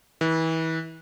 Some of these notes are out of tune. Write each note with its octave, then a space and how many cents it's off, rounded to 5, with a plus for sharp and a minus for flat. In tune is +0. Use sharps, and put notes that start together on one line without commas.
E3 -30